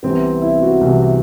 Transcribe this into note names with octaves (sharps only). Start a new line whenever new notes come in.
C2 C3 E3 B3 C4
E4
F#4
C2 C3 E3 B3